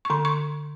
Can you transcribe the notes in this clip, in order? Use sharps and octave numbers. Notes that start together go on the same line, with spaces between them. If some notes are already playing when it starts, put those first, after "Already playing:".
C#6
D3 C6
C#6